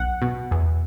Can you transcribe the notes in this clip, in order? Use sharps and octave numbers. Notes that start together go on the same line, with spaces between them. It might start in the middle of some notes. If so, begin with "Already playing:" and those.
Already playing: B1 F#5
B2
E2